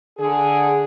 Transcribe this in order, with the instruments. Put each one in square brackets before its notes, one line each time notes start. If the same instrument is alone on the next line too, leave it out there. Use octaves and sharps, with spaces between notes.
[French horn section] D3 G#4